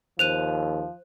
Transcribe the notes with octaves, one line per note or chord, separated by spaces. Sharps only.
D#2 F3 C5 F#6 D#7 F7